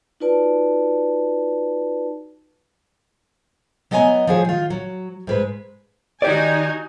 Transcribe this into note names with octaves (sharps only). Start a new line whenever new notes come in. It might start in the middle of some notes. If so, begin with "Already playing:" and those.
D#4 F4 F#4 B4 D5 A5
F#3 B3 D#5 F#5 G#5 A#5
F3 F#3 G#4
D#3 F4
F#3
G#2 G#3 B4
D#3 D#4 F#4 G4 D5 G#5